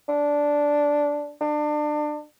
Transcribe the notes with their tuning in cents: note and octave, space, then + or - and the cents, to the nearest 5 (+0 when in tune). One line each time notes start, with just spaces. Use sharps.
D4 -5
D4 +30